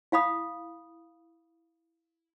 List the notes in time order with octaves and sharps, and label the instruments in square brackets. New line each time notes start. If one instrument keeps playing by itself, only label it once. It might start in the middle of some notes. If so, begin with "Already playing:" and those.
[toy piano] E4 F5 B5 D#6